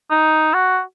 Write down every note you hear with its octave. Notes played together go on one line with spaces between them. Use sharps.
D#4
F#4